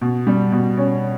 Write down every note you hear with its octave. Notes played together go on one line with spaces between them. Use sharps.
B2
G3
B2
C#4